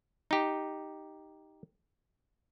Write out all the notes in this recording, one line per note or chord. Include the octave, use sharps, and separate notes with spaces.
D#4 G4